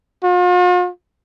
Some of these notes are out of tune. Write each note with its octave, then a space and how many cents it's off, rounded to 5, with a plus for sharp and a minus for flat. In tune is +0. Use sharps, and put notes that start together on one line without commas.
F4 +45